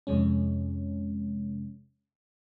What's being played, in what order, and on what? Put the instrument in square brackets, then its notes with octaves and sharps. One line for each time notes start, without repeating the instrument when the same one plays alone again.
[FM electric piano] F2 C3 G#3 C#4